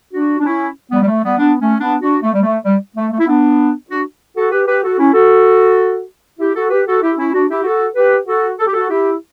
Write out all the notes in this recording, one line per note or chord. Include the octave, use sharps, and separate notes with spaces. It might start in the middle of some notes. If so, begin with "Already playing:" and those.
D4 F#4
D4
C#4 E4
G3 B3
G3
A3
G3 B3
B3 D4
A3 C#4
B3 D4
D4 F#4
A3
G3
A3
G3
A3
A3
E4
B3 D4
D4 F#4
F#4 A4
G4 B4
G4 B4
F#4 A4
C#4 E4
F#4 A4
E4 G4
F#4 A4
G4 B4
F#4 A4
E4 G4
C#4 E4
D4 F#4
E4 G4
F#4 A4
G4 B4
F#4 A4
A4
G4
F#4 A4
E4 G4